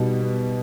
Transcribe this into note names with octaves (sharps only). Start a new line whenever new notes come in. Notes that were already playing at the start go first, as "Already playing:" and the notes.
Already playing: B2 G3 D#4
B3